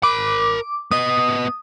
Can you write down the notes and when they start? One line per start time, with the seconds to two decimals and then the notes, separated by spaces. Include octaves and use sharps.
0.03 A#4 B5 D6
0.91 B3 D#5 D#6